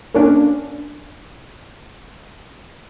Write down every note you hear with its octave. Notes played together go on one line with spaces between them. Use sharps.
A#3 C#4 D4